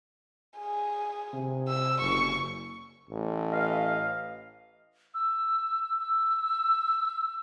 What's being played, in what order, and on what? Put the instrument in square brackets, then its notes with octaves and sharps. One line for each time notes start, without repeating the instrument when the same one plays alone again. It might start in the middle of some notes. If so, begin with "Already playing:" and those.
[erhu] G#4
[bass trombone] C3
[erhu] E6
[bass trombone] F#1 [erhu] C#6
[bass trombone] A1
[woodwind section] B4 D#5 F5
[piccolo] E6
E6